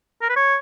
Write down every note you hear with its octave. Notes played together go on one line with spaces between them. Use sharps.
A#4
B4
C#5